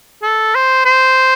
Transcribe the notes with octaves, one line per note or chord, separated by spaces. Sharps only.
A4
C5
C5